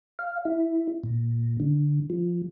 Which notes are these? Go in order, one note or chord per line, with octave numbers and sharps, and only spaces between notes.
F5
E4
A#2
D3
F3